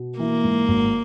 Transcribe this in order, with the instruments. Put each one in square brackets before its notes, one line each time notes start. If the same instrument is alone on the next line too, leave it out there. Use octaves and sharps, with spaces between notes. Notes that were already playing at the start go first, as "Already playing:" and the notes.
Already playing: [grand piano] B2
[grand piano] E3 [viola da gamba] A#3
[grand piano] G#2
G#1